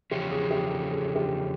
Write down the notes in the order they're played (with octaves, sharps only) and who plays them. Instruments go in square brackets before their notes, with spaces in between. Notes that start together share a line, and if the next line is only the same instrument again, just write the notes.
[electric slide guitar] E2 C#3 F3 C#4 [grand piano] G4
[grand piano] G#4
G4
A4
G#4
G4